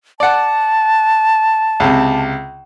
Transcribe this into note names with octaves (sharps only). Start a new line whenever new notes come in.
D5 F#5 A5
C#2 C3